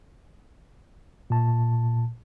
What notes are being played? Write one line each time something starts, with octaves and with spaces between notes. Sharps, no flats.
A#2 A5